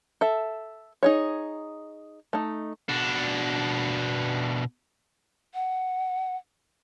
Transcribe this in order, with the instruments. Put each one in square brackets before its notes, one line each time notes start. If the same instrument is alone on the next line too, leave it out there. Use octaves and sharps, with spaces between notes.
[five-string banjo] A4 E5
D#4 G#4 C#5
A3 D#4
[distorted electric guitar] B2 D4
[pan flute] F#5